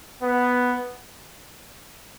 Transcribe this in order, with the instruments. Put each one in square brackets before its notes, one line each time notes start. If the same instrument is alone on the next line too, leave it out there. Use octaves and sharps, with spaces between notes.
[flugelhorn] B3